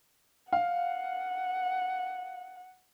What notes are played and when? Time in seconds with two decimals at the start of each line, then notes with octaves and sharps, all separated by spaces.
0.53 F5 F#5